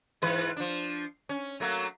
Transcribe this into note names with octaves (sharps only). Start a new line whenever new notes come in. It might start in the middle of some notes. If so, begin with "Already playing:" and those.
G#2 E3 B4
F3 D4
C#4
F#3 A3 A#3